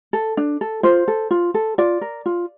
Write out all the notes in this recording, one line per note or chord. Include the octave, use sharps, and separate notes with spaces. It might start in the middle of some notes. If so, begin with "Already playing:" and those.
A4
D4
A4
F4 C5
A4
F4
A4
F4 D5
A#4
F4